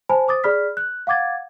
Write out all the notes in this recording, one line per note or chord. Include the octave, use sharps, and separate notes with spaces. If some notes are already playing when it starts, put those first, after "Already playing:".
C5 G#5 A5 B5
C5 D6 D#6 A6
G#4 D5 B5 F6 B6
F#6
F5 F#5 D6 G#6 A6